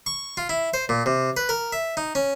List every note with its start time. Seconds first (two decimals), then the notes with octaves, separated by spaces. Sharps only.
0.06 C#6
0.37 F4
0.49 E4
0.74 C5
0.89 A#2
1.06 C3
1.37 B4
1.49 A#4
1.73 E5
1.97 D#4
2.15 C#4